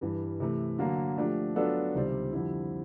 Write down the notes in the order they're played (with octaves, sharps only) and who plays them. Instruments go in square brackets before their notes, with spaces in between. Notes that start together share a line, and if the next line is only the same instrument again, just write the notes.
[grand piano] G2 E3 G3
C3 E3 A3
D3 F#3 A#3
F3 A3 D4 G4
F#3 B3 D4 F4 A4
C#2 C3 D#3 G3 C4
F2 D3 G3 C4 E4